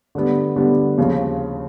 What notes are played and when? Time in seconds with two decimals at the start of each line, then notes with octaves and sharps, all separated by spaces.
0.15 D3 G3 B3
0.56 D3 G3 B3
0.97 D#2 C#3 F3